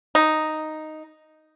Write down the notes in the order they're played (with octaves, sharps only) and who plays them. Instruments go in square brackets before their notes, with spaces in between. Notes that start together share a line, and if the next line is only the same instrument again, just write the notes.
[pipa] D#4